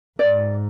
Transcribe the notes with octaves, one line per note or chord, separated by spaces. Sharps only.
G#2 D5